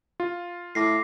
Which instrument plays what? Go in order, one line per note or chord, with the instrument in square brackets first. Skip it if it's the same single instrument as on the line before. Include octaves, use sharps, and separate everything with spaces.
[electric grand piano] F4
[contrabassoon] A2 [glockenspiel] D6 A#6 C7